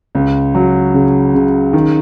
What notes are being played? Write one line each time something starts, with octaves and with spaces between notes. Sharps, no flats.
C#2
F#3
C#3
C#3
D#3